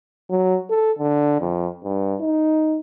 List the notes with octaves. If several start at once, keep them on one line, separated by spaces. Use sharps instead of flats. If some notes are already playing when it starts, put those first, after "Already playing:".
F#3
A4
D3
F2
G2
D#4